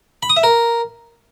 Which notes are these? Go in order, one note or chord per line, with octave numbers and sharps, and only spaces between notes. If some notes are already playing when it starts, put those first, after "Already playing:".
B5
D#6
E5
A#4